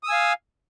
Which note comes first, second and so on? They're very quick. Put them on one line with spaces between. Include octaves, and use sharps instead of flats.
D#6 E6 G#5 F5